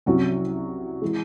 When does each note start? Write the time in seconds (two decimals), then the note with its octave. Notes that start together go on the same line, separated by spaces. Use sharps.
0.06 C2 C3 F#3 C#4 F#4
1.02 E3 G#3